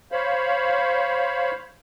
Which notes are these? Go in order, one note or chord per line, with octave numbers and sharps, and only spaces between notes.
C5 C#5 F5 B5